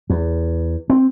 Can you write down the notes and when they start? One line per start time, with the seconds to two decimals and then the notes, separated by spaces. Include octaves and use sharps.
0.10 E2
0.90 C4